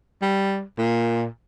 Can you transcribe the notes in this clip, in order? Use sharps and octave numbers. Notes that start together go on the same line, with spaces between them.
G3
A#2